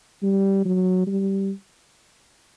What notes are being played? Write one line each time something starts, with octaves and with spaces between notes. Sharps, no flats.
G3
F#3
G3